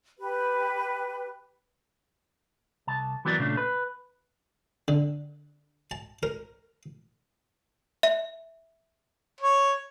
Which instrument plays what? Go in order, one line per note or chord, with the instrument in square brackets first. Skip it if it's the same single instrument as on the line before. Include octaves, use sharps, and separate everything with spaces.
[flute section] G4 B4
[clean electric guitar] C2 A5
E3 F#3 B3 G4 A#4 D5
A#2 C#3 A3 D4
B4
[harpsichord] D3
A5
A#4
[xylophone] E5
[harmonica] C#5